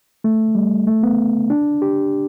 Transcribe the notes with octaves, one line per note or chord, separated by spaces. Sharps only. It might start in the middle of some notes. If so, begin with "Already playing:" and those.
A3
G3
A3
B3
D4
G4